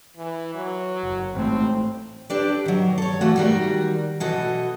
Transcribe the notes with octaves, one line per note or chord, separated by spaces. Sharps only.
E3
F#3
F#1
A1 G#2 A3 C4
D4 G4 A4 B4 D5
D#3 F#3
A4 C#5
E3 F3 A3 F#4
D#3 G3 F#4
B2 E3 F#4 A4 D#5